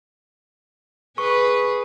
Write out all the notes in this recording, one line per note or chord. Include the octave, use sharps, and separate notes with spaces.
G#4 B4 C#6